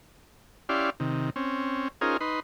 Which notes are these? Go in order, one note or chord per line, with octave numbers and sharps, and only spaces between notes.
C#4 E4 G4 D5 F5 C6
C3 D#3
C4 C#4
C#4 D#4 F4 G#4 A#4 C5
D#4 B4 C6